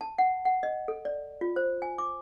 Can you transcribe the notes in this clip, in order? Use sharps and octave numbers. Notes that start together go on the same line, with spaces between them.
A5
F#5
F#5
D#5
A4
D5
F4
C5
G#5
D6